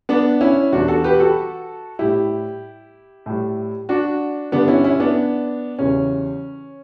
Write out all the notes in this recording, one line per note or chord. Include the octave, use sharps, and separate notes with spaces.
B3 D4
C#4 E4
E2 B2 G3 D4 F#4
F#4 A4
G4 B4
F#4 A4
A2 G3 E4 G4
A2 G3
D4 F#4
G2 D3 G3 B3 D4
C#4 E4
C#4 E4
B3 D4
E2 C#3 E3 G3 C#4